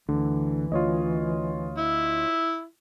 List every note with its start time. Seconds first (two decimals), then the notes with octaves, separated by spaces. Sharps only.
0.09 D2 D3 E3
0.72 D2 F4 C#5 D#5
1.78 E4